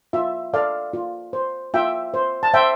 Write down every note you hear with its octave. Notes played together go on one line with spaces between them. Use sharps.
F4 E5
A4 D5 F5
F4
C5
F4 E5 G5
C5
A5
C5 E5 G5